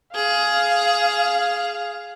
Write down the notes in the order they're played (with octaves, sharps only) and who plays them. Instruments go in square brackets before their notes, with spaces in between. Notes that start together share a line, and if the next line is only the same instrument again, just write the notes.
[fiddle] G#4 [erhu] F5